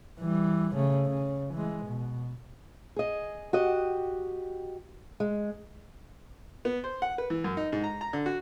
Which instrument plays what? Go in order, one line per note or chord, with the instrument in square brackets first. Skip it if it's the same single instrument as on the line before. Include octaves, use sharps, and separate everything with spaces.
[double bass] E3 G3
C#3 A3
C#3
E3 G#3
B2
[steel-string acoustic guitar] G#4 D#5
F#4 G4 D#5
G#3
[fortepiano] B3
C5
F#5
B4
E3
F#2
D#4
G#2
A#5
A#5
D3
F#4